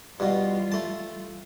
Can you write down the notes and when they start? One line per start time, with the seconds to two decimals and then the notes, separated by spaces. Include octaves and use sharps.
0.20 G2 B2 E3 G3 F4
0.72 A3 A5